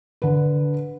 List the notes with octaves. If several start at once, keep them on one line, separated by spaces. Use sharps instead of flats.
D3 B4